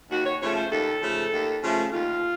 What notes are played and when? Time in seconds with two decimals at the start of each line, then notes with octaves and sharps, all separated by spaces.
0.10 D#2 F#4
0.25 C#5
0.41 C#3 F3 A3 C#5
0.56 C5
0.71 D#2 A4
1.01 C#3 F3 A3
1.32 D#2
1.63 C#3 F3 A3
1.92 D#2 F4